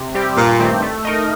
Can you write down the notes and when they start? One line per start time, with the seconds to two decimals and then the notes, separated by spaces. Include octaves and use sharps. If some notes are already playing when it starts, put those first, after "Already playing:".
Already playing: C3
0.15 G3 C4 G4
0.37 G2 A#2
0.59 D#3 A3 C4 G4
0.82 A3
1.05 D#4 A#4 D#5